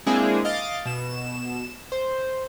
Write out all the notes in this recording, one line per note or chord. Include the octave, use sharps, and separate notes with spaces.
G#3 A#3 C4 D4 E4 G#4
D#5 F5 D6 A6
B2 E7
C5